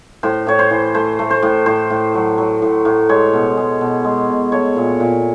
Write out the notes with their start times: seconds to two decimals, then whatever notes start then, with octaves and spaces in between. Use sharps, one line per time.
0.23 A2 C5
0.47 A2 C#5
0.59 C5
0.70 E3
0.95 A3 C5
1.19 A3
1.31 C5
1.43 A2
1.66 A2 C5
1.90 A2
2.14 F#3
2.38 F#3
2.62 A2
2.85 A2
3.09 G#3 C#5
3.33 B2
3.57 G#3
3.81 B2
4.04 G#3
4.29 B2
4.52 A3 C#5
4.76 A#2
5.00 A#2